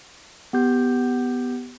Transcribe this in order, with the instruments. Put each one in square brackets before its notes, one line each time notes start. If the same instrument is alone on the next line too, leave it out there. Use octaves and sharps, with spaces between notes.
[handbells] B3 G4 G6